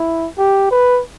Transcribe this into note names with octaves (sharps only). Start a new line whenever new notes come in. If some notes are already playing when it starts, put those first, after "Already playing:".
Already playing: E4
G4
B4